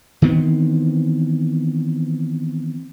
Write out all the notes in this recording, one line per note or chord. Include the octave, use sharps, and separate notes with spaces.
D#3 E3 B3 C4